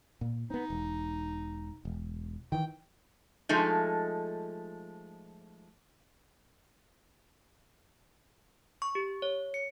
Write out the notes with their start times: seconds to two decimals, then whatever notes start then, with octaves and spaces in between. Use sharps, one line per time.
0.21 A#2
0.50 B3 C4 D#4
0.70 E1
1.85 E1
2.52 D#3 E3 G5
3.49 F3 G#3 A3 D#4
8.82 C#6
8.95 G4
9.22 C#5
9.54 C#7